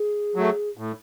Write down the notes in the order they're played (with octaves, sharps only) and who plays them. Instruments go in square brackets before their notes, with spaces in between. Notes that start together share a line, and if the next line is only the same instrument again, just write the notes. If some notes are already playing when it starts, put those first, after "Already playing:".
Already playing: [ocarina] G#4
[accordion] F#3 A3
A2